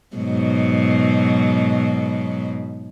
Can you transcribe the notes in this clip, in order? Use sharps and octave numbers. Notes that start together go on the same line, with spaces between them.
G#2 B2 F#3